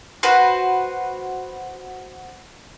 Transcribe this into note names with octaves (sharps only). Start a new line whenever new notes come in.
F#4 B4 C5